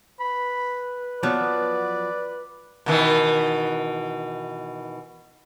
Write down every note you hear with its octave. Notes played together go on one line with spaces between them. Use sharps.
B4 B5
F3 F#3 B3 D5
B2 D#3 E3